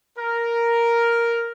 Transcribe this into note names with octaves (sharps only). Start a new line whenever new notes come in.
A#4